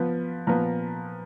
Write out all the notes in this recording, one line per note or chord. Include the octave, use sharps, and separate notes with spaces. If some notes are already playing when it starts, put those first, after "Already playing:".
Already playing: F3 B3
A#2 F3 B3 A#5